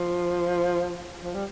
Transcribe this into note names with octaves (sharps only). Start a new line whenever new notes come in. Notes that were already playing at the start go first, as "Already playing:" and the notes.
Already playing: F3
F3
G3